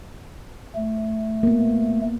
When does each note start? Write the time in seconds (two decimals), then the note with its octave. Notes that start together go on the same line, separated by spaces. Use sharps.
0.76 A3
1.43 A#3 B3